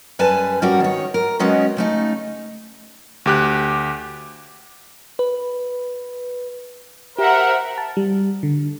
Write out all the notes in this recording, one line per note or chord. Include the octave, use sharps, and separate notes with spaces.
F#2 G3 B4 G#5 A5
G3 A#3 C#4 F#4 A#4
D#3 C#5
A#4
D#3 F#3 G#3 B3 C#4 D#4
C#3 A3 D#4
D2 G4 F#6
B4
G4 A#4 C5 E5 F#5
A5
G3
D3